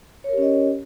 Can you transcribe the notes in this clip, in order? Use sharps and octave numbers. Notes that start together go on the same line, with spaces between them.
C#4 G4 A#4 C#5 D#5